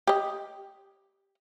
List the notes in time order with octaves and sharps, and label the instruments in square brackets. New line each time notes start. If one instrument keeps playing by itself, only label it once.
[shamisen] G4 D#5